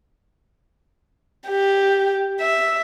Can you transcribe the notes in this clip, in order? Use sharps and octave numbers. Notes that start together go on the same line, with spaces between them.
G4
E5